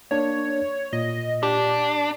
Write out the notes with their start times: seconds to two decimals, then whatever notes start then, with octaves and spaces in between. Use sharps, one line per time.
0.11 A#3 D4 C#5
0.93 A#2 D#5
1.43 D4 G4